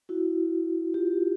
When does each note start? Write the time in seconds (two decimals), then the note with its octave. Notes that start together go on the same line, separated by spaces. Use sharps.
0.09 E4 F#4
0.94 F4 G4